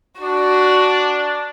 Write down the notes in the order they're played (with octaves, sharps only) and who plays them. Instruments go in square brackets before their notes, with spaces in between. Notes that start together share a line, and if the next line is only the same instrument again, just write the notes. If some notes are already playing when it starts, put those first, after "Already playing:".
[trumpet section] D4 [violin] F#4